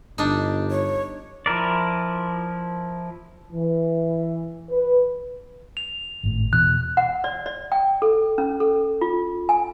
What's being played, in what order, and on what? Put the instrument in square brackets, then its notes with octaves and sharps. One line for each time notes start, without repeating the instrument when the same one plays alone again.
[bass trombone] G1 [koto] D4 D#4
[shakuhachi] C#5
[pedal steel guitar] F3 E4 A#4 D5
[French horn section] E3
B4
[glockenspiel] F7
[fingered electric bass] G#1 A2
[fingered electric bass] E2 B2 E3 [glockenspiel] F#6
[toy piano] F#5
D5
D5
G5
A4
C#4
A4
F4
G#5